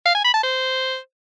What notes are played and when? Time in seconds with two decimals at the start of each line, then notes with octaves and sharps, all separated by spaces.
0.06 F5
0.15 G#5
0.24 B5
0.34 A5
0.43 C5